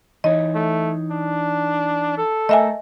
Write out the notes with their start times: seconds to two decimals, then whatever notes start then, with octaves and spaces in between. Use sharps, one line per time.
0.24 E3 D#4 C#5 D#5
0.55 A3
1.11 D4
2.18 A4
2.49 A3 A#4 D#5 E5 G#5